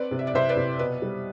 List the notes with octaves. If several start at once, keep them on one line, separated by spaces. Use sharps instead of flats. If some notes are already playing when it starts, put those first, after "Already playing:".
Already playing: C4 B4 D5
C3
E5
D5
C3 C5 E5
B4 D5
C3
B2 B4
G3